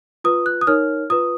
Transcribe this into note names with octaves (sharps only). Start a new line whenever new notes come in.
F4 B4 D#6
F#6
D#6
D#4 A#4 C#5 F6
F4 B4 D#6